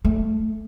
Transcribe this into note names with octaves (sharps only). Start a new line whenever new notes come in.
A3